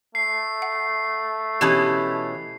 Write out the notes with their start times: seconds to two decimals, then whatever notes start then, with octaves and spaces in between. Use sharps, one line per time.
0.15 A3 C7
0.62 F#5
1.61 B2 E3 C#4 G4 A5 D#6